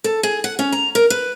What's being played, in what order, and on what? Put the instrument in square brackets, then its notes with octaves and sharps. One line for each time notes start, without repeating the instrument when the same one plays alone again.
[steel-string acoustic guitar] A4
G#4
F#5
C#4
A#5
A#4
B4